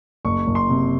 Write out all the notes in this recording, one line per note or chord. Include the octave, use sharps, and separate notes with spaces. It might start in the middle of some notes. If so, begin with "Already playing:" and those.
F#1 C#6
F#1
C6
C3